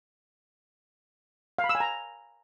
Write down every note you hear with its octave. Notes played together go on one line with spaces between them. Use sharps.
F5
B5
E6
G#5
A#5